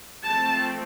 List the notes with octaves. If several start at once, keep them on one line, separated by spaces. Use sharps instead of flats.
F3 A3 C4 A5